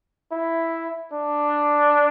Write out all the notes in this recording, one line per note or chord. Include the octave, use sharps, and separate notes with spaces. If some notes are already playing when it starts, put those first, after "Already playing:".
E4
D4